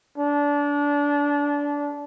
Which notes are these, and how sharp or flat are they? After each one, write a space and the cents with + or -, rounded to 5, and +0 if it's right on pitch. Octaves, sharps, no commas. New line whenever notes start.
D4 -25